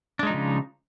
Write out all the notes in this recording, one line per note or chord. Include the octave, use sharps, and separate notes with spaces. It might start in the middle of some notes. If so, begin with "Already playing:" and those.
C#3 F3 G#3 D4 D#4